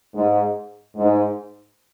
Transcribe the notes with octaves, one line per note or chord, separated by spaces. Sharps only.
G#2
G#2